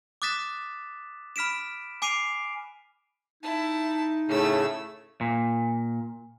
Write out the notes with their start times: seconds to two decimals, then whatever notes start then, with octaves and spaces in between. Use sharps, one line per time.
0.22 D6 D#6 F#6 A6 B6 E7
1.36 B5 F6 B6 D7 E7
2.02 G#5 D6 C7 D7 D#7 F7
3.43 D#4 E4 A5
4.28 A2 C#3 A3 E6
5.21 A#2